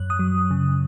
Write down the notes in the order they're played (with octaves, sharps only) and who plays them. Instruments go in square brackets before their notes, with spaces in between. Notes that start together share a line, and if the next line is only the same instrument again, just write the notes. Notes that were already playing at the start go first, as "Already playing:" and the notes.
Already playing: [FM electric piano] F#2 F#6
D#6
F#3
C#3